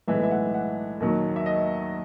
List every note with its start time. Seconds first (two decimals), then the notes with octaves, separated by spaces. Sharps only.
0.08 B1 A2 E3 G#3 E5
0.23 E5
0.31 F#5
0.54 F#5
1.00 D#2 D#3 F#3
1.36 E5
1.46 D#5